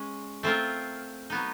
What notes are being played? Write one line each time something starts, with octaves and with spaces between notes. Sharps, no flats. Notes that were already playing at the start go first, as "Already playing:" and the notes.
Already playing: G#3 C#4
A3 C4 F4 A#4
F#3 B3 D#4